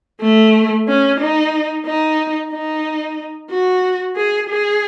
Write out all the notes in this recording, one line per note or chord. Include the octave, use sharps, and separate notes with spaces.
A3
C#4
D#4
D#4
D#4
F#4
G#4
G#4